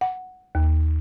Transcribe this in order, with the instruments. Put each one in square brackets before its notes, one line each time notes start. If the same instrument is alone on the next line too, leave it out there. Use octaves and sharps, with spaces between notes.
[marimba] F#5
D#2